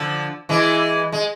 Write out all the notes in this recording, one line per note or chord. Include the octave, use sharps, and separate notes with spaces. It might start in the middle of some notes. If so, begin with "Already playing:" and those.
Already playing: D3 F3
E3 G#3
G#3